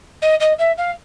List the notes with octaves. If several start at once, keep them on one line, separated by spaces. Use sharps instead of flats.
D#5
D#5
E5
F5